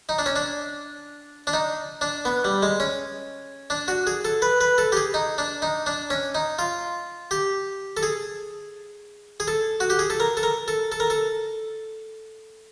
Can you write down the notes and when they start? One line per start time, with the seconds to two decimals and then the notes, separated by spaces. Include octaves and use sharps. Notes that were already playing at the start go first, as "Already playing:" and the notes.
0.09 D#4
0.18 D4
0.26 C#4
0.36 D4
1.47 D4
1.53 D#4
2.01 D4
2.25 B3
2.45 G3
2.62 G#3
2.80 C#4
3.70 D4
3.88 F#4
4.07 G#4
4.25 A4
4.42 B4
4.61 B4
4.78 A4
4.92 G4
4.97 G#4
5.14 D#4
5.38 D4
5.62 D#4
5.86 D4
6.10 C#4
6.35 D#4
6.59 F4
7.31 G4
7.97 A4
8.03 G#4
9.40 G#4
9.48 A4
9.80 F#4
9.90 G4
9.99 G#4
10.10 A4
10.20 A#4
10.37 A4
10.43 A#4
10.68 A4
10.92 A4
11.00 A#4
11.10 A4